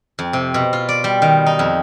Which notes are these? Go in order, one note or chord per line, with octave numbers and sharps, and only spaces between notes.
F2
C3
B2
F4
D5
G3
D#3
D#4
F2